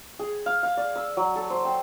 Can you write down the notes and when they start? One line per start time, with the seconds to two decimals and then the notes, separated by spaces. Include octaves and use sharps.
0.19 G#4
0.46 F5
0.63 F5
0.77 D5
0.96 E6
1.17 F#3
1.36 A4
1.50 C5
1.65 G5